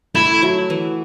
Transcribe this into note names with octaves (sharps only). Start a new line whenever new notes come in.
A3 E4
F#3
E3